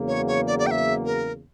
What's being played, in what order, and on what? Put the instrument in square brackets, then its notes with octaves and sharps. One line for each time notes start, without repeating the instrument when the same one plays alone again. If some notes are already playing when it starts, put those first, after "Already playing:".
Already playing: [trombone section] E2 C#3 F#3 A#3
[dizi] C#5
C#5
D5
D5
G5
E5
A#4